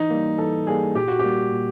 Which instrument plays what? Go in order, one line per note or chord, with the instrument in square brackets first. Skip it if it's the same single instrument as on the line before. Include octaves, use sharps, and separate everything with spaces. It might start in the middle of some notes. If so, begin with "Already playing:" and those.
Already playing: [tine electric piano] E3 [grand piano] D#4
[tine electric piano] G3 A#3
[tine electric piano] E3 [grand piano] A4
[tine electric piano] G3 A#3 [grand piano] G#4
[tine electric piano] A#2 [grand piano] G4
[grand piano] F#4
[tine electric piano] G3 A#3 [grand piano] G4
[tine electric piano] A#2